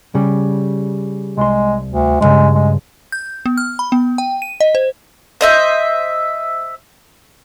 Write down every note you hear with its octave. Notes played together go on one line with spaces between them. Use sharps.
C#3 G3
C2 G#3 C6
D2
B1 G2 C#3 G#3
G#3
G6
B3
F6
B5
B3
G5
D#7
D#5
C5
C5 D#5 E5